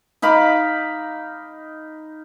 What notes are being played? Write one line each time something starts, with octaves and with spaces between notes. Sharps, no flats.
D#4 F5 B5 D6